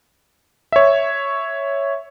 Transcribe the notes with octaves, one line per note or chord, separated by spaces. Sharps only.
C#5 E5